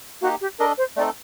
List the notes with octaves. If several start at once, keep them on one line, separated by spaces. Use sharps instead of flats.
A#3 D#4 F#4 G4
G4
D4 A4 A#4 D#5
C5
A3 C4 D#4 A4 D5